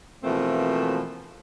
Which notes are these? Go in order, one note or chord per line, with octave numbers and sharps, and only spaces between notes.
B2 E3 F3 A3 A#3 C4